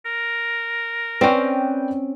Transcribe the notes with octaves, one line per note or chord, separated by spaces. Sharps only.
A#4
C4 C#4 B4 D5 G5